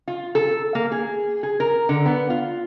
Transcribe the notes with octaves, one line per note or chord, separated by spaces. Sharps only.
F4
A4
A#3
G#4
G#4
A#4
D3
B3
F4